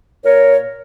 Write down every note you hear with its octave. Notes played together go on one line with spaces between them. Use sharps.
A#2 A#4 C#5